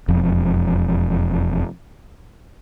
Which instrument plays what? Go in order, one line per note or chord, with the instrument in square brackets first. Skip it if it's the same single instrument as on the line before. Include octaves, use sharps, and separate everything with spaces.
[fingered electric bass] E1 F2